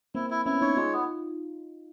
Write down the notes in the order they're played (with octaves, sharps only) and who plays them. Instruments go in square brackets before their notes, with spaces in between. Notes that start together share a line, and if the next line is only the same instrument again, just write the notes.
[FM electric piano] A#3 C4 [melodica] E4
[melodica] E4
[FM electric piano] B3 C#4 [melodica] E4
[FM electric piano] C#4 D#4 [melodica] C#5
[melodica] G#3 [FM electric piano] D#4 F4
[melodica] B3